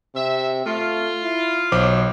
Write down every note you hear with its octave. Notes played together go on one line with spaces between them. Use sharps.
C3 E5
A3 F4
E4
B1 C5 C#5 D6